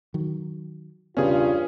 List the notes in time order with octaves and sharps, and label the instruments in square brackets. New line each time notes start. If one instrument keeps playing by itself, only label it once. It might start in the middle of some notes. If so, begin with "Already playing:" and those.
[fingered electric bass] D#3 F#3
[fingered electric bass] E1 C#3 B3 [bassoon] G2 [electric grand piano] C#4 G#4 [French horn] F4